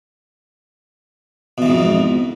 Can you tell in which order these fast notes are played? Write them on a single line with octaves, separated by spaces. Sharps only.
B2 E3 G#2 F2